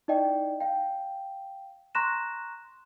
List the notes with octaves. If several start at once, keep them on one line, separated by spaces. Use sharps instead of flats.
D#4 E4 D5 D#5 G5
F5 G5
A#5 C6 C#6 F#6 A#6 E7